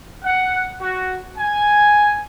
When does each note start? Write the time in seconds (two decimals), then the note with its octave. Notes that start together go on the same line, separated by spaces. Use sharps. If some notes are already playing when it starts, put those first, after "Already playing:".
0.24 F#5
0.80 F#4
1.38 G#5